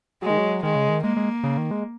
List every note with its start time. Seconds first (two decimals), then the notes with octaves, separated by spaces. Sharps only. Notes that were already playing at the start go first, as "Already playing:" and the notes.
0.22 F#3 G#3
0.30 D#3
0.38 F#3
0.63 D#3 G#3
0.76 C#3
0.89 D#3
1.03 G#3 A#3
1.17 G#3
1.44 C#3
1.57 D#3
1.71 G#3